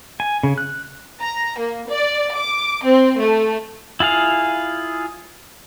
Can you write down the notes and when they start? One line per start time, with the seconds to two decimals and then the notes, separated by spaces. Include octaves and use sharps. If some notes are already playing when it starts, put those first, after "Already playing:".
0.20 G#5
0.43 C#3
0.58 F#6
1.23 A#5
1.59 A#3
1.91 D5
2.36 D6
2.86 C4
3.22 A3
4.00 E4 F4 G#4 F5